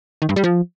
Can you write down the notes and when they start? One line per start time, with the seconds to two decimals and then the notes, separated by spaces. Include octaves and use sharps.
0.22 D#3
0.29 G2
0.36 G3
0.44 F3